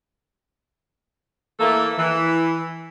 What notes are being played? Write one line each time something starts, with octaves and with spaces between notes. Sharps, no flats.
E3 A3 A#3 A4
E3